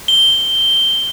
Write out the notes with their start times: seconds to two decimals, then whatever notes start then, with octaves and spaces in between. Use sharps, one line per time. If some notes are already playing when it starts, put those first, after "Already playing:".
0.08 G7